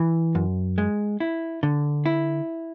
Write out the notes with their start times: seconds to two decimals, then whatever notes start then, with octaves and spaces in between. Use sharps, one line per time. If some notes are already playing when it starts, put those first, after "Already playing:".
Already playing: E3
0.35 F#2
0.78 G#3
1.20 E4
1.63 D3
2.06 E4